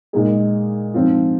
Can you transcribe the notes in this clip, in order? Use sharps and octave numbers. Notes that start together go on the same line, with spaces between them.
A#2 G#3 D#4 G#4
G#2 F3 C4 F4